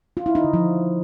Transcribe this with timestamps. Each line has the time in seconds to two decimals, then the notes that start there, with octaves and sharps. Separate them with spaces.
0.17 F4
0.26 E4
0.35 D#4
0.44 D3
0.54 F3